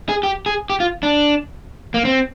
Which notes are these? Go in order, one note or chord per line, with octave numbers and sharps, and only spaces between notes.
G#4
G4
G#4
G4
F4
D4
A#3
C4